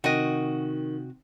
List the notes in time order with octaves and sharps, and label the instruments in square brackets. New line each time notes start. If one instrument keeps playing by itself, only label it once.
[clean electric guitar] C3 G5 [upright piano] D#3 [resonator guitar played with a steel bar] F#4 D#5